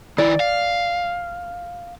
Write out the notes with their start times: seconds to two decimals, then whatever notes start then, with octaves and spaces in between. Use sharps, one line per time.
0.18 D#3 E4 D5
0.40 F5